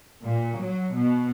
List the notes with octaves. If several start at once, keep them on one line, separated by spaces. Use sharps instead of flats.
A#2
F#3
B2